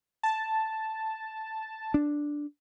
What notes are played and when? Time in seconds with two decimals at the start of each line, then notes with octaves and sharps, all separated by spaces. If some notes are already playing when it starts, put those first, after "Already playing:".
0.23 A5
1.94 D4